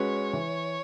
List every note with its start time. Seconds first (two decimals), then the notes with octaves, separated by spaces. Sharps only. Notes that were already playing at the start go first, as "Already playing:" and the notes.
Already playing: G#3 C#4 F#4 B4 C#5
0.33 E3